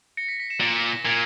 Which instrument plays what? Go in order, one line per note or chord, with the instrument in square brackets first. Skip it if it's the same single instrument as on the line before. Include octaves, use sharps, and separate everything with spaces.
[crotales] A#6 C#7
B6
B6
C#7 E7
[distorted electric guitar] A#2 [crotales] A#6 C#7
[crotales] B6
A#6
[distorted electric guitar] A#2 [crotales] G#6